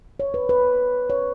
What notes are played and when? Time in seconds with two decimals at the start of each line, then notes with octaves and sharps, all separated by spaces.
0.20 C#5
0.34 B4
0.49 B4
1.10 C#5